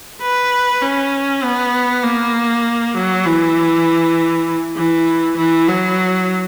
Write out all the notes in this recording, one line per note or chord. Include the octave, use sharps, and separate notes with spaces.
B4
C#4
B3
A#3
F#3
E3
E3
E3
F#3